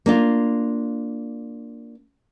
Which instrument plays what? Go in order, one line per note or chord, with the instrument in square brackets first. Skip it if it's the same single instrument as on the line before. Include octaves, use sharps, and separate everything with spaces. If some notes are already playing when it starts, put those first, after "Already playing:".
[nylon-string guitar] A#3 D4 F4